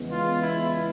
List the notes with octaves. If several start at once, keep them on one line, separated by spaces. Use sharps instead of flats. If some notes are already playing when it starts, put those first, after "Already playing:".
Already playing: E2 C#3 E3 G#3 B3
F4
E4